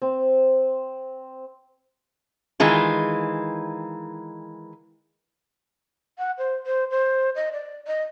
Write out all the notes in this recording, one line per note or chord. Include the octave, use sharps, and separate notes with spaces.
C4
D#3 E3 G#3 F4
F#5
C5
C5
C5
D#5
D5
D#5